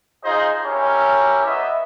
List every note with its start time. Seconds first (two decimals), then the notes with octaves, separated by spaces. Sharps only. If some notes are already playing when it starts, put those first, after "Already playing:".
0.24 D#4 F4 G#4 C5 D#5
0.63 C#4 E4 G4 A#4 C#5
1.46 B3 D#5 E5